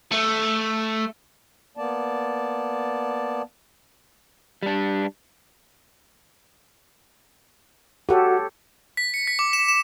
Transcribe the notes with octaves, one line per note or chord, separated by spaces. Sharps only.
A3
A#3 B3 D5 A5
G3 D4
F#4 G4 A4 C#5 F#5
B6
C#7
B6
D6
E7
E7